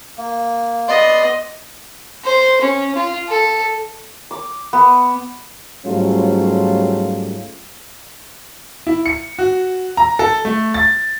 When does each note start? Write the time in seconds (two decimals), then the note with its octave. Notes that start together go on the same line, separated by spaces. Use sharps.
0.18 A#3
0.88 B3 D5 D#5 C6
2.24 C5
2.61 C#4
2.96 F4
3.28 A4
4.31 D6
4.73 B3
5.86 G#2 F#3 G3 A3 C#4 F4
8.87 E4
9.06 C#7
9.39 F#4
9.97 A#5
10.19 A4
10.45 A3
10.74 A6